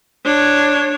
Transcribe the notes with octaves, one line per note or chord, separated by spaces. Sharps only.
D4 C#5